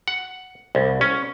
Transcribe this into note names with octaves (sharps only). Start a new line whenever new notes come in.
F#5
C2
C#4